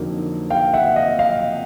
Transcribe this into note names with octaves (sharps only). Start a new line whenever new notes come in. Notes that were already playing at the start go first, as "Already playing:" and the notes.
Already playing: F2 D3 F#3 A#3 D#4
F5 G5
E5 F#5
D#5 F5
D#5 F5